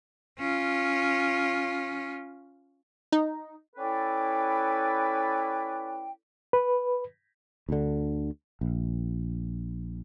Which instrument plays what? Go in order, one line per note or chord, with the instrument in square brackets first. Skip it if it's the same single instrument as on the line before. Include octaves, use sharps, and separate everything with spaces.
[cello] C#4 F4
[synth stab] D#4
[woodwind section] C#4 E4 A4 B4 D5 G5
[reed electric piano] B4
[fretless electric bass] D2 D3
A#1